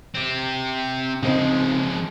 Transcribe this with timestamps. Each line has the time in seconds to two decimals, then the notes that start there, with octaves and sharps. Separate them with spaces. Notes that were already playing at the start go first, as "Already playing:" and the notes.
0.14 C4 G4
1.23 C#3 F3 G#3 C4 D#4